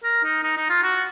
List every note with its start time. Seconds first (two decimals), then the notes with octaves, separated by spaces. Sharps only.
0.04 A#4
0.24 D#4
0.44 D#4
0.57 D#4
0.70 F4
0.83 F#4